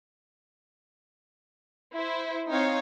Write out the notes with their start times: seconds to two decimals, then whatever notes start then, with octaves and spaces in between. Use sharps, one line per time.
1.94 E4 C5
2.49 C4 D#4 C#5 F5